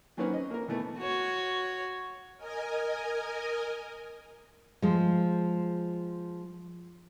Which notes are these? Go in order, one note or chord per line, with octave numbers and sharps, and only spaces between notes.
D#3 F#3 A#3 C4 C#4 B4
D#5
A#3 A#4
B2 E3 A3 B3
F#4 C#5
A#4 D#5 G#5
F3 G#3